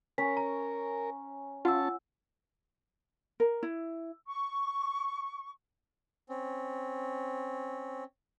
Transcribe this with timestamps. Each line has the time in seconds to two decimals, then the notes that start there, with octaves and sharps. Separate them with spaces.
0.18 C#4 A#4 B6
0.37 A#5
1.65 C#4 F4 F#5 A5 E6
3.40 A#4
3.63 E4
4.27 C#6
6.29 C4 C#4